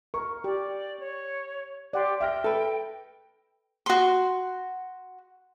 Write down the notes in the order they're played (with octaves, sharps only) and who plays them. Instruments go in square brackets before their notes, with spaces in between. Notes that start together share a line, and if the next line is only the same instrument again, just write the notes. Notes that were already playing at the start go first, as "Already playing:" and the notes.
[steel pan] A#4 [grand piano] C#6
[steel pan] G4 [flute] D5
[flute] C#5
[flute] G4 [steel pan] D5 F#5 C6
[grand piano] E5 F6 A#6 [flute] G5
[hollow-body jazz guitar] A4 B4
[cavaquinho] F#4 C6